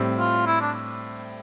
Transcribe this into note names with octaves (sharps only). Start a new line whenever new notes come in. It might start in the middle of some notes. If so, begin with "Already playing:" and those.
Already playing: A2 G3 C4
F4
E4
D4